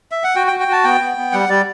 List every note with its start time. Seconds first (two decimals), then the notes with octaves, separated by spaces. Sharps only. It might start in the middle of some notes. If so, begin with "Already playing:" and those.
0.12 E5
0.24 F#5
0.35 F#4 G5
0.47 G5
0.52 F#4
0.60 G5
0.68 F#4 A5
0.84 B3 G5
1.01 B3
1.17 B3
1.32 G3 F#5
1.49 G3 D5